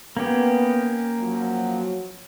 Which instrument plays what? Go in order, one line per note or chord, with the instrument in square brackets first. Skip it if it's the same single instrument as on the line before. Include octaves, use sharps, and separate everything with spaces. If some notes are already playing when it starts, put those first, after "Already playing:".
[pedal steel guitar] A#3 C#4 G4 [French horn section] B3
[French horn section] F3 F#3